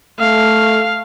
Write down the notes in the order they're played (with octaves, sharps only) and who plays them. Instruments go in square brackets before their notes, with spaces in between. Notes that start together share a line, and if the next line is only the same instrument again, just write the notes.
[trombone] A3 [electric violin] F5